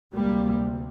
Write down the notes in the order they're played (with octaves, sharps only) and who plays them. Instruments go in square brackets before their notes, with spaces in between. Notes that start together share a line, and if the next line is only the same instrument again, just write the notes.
[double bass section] D2 C3 G3 A#3